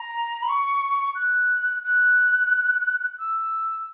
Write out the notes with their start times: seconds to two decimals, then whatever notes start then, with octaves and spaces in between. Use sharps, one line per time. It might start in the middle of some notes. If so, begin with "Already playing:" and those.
Already playing: A#5
0.42 B5
0.48 C#6
1.15 F#6
1.84 F#6
3.19 E6